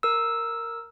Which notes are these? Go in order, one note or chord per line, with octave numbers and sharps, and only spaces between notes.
A#4 E6